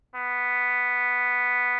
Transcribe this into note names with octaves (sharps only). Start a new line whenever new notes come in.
B3